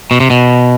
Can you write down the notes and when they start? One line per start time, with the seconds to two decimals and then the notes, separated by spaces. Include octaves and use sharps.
0.11 B2
0.20 C3
0.30 B2